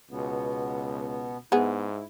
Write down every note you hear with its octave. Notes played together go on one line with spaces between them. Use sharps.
C#2 B2 B3
G#2 B3 E4 G#4